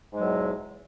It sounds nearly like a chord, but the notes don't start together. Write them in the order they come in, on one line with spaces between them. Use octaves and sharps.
G#2 G#3 F#3 B2 E2